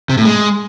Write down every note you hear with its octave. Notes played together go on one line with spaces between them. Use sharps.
C3
A2
G#3